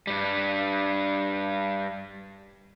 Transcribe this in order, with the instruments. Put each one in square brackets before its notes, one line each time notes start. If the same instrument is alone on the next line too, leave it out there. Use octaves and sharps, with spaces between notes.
[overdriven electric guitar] G2 G3